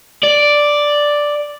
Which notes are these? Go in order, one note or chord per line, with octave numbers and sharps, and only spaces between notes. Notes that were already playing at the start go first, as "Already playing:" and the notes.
D5